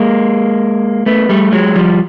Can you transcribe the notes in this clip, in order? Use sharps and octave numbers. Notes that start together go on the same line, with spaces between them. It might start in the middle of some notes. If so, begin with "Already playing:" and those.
Already playing: G#3 A#3
A3 B3
G3 A3
F#3 G#3
F3 G3